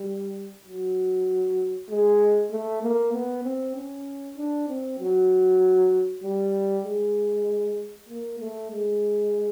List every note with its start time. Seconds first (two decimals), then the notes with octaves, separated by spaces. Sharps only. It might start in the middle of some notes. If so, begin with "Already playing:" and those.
Already playing: G3
0.65 F#3
1.89 G#3
2.51 A3
2.82 A#3
3.13 B3
3.44 C4
3.76 C#4
4.37 D4
4.68 C4
4.99 F#3
6.23 G3
6.84 G#3
8.09 A#3
8.39 A3
8.71 G#3